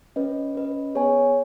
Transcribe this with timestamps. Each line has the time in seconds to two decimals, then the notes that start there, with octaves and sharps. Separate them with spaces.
0.16 C#4 B4 D#5
0.55 C#4 B4 D#5
0.95 B3 G#4 C#5 G#5